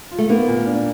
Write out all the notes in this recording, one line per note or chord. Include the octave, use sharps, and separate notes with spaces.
F4
A3
A#3 B3
A#2
D4